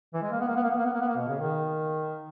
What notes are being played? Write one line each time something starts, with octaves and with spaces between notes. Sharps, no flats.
E3
G#3
A#3
B3
A#3
B3
A#3
B3
A#3
B3
A#3
B3
A#3
B2
C#3
D#3